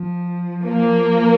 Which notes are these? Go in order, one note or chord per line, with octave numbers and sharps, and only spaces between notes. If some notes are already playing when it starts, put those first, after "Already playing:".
Already playing: F3
A#3